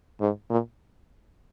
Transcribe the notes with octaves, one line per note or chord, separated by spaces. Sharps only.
G#2
A#2